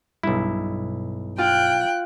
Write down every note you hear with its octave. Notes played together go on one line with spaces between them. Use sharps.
B1 G2 E4
F4 G5 F#6